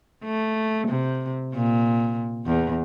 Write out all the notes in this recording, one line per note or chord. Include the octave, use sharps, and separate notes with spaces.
A3
C3
A#2
E2